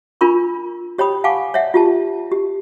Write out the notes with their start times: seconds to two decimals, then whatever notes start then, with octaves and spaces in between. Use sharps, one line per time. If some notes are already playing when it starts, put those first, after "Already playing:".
0.21 D4 F4 A#4 B5 C#6
0.98 G4 C#5 G5 B5 D#6
1.24 F5 F#5 G#5 A5 C#6 D6
1.54 C#5 D5 E5 F#5
1.74 F4 G4 A5
2.32 G4